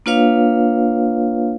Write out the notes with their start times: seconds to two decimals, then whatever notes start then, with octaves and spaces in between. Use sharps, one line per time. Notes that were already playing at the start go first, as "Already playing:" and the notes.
0.06 A#3 D4 F4 B4 C#5 F5